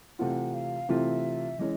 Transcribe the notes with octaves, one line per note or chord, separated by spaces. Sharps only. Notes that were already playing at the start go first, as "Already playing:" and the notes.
C3 E3 A3 C4 F4 F#5
F5
C3 E3 A3 C4 F4 E5
E3 G#3 C#4 D#5